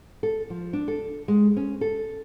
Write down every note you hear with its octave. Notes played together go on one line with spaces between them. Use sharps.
A4
F3
D4
A4
G#3
C#4
A4